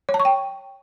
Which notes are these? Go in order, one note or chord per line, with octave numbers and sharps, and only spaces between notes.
C#5
A5
C#6
G5